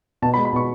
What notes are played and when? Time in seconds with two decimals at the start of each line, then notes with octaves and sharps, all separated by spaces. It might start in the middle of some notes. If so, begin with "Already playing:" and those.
0.22 B2 A5
0.34 B5
0.37 G#3
0.45 B5
0.53 B2 C#6